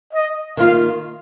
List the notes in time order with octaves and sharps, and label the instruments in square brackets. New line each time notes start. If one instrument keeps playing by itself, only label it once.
[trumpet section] D#5
[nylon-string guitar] D#3 A#3 F4 [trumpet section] F5